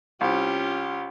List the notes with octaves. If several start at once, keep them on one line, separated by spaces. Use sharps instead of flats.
C2 C#4 F4 G4